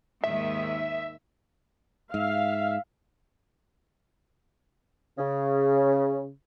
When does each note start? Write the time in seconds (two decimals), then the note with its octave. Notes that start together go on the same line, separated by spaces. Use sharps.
0.24 D#2 G#2 D#3 E5
2.14 G#2 E5 F5
5.18 C#3